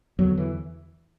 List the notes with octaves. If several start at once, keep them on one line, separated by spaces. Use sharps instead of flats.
E2 D3 F#3
E3